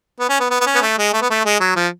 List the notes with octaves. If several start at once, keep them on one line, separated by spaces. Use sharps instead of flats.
B3
C#4
B3
B3
B3
C#4
B3
A3
G#3
A3
B3
A3
G#3
F#3
F3